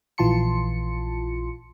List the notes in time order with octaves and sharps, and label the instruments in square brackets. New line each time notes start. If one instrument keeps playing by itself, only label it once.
[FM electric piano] A#1 E3 F4 A5 C6 C#7